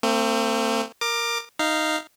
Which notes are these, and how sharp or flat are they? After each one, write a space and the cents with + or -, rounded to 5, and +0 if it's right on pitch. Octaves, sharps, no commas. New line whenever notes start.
A3 +45 C4 +0
A#4 +0 D6 +25
D#4 +0 F5 -10